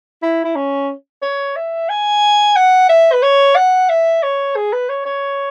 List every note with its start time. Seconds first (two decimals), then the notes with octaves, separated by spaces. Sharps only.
0.23 E4
0.44 E4
0.56 C#4
1.22 C#5
1.56 E5
1.89 G#5
2.56 F#5
2.89 E5
3.13 B4
3.23 C#5
3.56 F#5
3.89 E5
4.23 C#5
4.56 G#4
4.73 B4
4.89 C#5
5.06 C#5